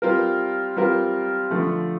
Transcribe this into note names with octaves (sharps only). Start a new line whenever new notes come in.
G3 C4 F4 A#4
G3 C4 F4 A#4
D3 F3 A3